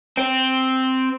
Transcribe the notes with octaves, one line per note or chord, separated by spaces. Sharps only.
C4